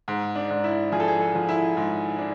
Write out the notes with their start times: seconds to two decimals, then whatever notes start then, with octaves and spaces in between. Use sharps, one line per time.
0.08 G#2
0.35 D4
0.50 G#2
0.64 E4
0.92 F3 G#4
1.00 A4
1.08 G#4
1.20 A4
1.35 F3
1.49 E4
1.77 G#2
2.19 D4